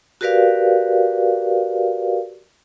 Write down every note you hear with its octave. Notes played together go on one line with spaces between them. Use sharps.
F#4 G4 A#4 B4 D5 F5